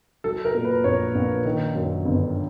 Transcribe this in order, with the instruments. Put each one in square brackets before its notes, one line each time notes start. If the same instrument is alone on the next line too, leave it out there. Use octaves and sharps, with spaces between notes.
[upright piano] F#3 A4
A#4
A#2
B4
A#1 C#5
A#1
D#3
F#2
G1